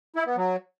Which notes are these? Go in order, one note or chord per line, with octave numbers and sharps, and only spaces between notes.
E4
B3
F#3